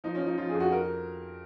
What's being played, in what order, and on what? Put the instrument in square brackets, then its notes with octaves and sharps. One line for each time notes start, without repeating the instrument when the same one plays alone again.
[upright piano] F3 D#4
C#4
F3
D#4
F3 F4
G#4
F2
F#4
A#4